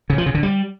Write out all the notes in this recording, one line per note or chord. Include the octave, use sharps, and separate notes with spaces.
C#3
F3
C#3
D3
G3